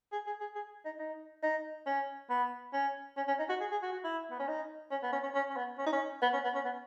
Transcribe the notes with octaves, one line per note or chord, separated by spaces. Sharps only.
G#4
G#4
G#4
G#4
D#4
D#4
D#4
C#4
B3
C#4
C#4
C#4
D#4
F#4
G#4
G#4
F#4
F#4
E4
B3
C#4
D#4
C#4
B3
C#4
C#4
C#4
C#4
B3
C#4
D#4
C#4
B3
C#4
B3
C#4
B3